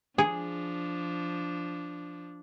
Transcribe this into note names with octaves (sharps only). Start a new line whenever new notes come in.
F3 D4 G#4